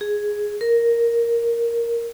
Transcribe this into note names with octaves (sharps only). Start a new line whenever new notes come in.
G#4
A#4